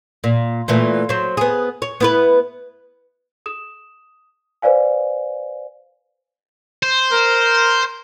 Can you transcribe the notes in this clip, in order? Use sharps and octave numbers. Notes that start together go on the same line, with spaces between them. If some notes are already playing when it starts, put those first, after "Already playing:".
A#2
A#2 E3 A3
F#3 C5
B3 G#4
C#5
B3 E4 B4
D#6 E7
B4 C5 D5 F5 G#5
C5
A#4